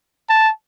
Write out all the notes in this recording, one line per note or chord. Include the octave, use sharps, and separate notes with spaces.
A5